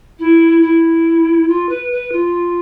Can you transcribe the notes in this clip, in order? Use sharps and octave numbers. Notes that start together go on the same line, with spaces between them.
E4
E4
F4
B4
B4
F4